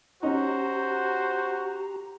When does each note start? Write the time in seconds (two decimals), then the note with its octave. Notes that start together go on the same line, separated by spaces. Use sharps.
0.23 C#4 D#4 F#4 G4 C5 A#5